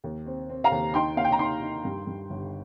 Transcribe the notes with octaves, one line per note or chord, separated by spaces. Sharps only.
D#2
C4
C4
F5 A#5
D#2
D#4 G5 C6
A#3 F5
G5
A#5
D#4 G5 C6
D#4
G2
G2
G1